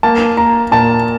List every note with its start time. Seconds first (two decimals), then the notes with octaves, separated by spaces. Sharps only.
0.03 A#3 A5
0.37 A#3 A#5
0.71 A#2 A5